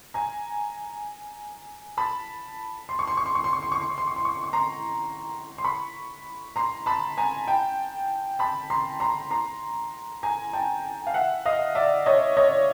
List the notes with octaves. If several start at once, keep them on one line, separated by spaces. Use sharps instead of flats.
G#5 A#5
A5 B5
C6
C#6
C6
C#6
C6
C#6
C6
C#6
C6
C#6
C6
C#6
C6
C#6
C6
C#6
C6
C#6
A#5 C6
C6
B5 C#6
A#5 C6
A5 B5
G#5 A#5
G5 A5
A5 B5
A#5 C6
A#5 C6
A#5 C6
G#5 A#5
G5 A5
F5
E5 F#5
D#5 F5
D5 E5
C#5 D#5
C#5 D#5